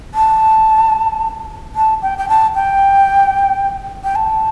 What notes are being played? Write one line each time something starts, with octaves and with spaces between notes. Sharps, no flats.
A5
A5
G5
G5
A5
G5
G5
A5